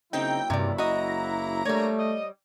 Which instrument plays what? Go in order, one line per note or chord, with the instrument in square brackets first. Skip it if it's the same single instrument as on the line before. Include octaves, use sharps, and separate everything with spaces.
[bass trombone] C#3 [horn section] F#3 A#3 E4 [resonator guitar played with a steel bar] C4 D#4 [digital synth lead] G5
[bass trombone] F#1 [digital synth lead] G2 [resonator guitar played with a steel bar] C3 D5
[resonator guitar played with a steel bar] F#4 D#5 [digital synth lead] A#5
[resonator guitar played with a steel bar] G3 C#5 [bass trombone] A3 [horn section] A#3 D4
[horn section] D#5